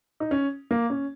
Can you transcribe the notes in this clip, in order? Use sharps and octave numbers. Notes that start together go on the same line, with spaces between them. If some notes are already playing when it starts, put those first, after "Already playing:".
D#4
C#4
A#3
C#4